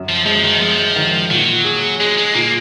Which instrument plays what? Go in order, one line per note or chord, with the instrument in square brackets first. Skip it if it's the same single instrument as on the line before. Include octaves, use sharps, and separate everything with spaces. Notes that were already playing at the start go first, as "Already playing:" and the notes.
Already playing: [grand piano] F#2
[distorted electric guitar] F3
[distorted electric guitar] F3 [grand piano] G#3
[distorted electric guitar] D#3
[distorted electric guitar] F3 [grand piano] G#3
[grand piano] D#3
[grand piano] A#2 [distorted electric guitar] F#3
[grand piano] G#4
[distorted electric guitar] G#3 [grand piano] G#4
[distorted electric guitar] G#3
[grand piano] A#2 [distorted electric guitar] A#3